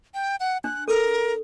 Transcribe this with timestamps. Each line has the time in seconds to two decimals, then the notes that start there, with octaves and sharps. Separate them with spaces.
0.14 G5
0.40 F#5
0.64 D4 F#6
0.88 A4 A#4